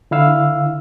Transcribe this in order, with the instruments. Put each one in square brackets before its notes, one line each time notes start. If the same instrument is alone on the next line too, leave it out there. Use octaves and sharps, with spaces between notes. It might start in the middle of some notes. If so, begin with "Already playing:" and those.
[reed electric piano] D3 E4 F5 E6